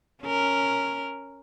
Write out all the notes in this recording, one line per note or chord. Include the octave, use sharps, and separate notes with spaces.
C#4 A#4